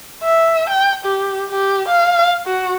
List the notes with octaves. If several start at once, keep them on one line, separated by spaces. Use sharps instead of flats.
E5
G5
G4
G4
F5
F#4